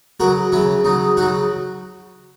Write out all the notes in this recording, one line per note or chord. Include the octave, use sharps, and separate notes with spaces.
C#3 F#3 F#4 A#4
C#3 F#3 C#4 E4
C#3 F#3 D#4
C#3 F#3 D#4 F#4